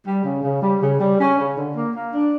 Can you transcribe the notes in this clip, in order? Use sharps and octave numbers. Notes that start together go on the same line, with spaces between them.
G3
C#3
C#3
G3
C#3
G3
C#4
C#3
D3
A#3
A#3
D4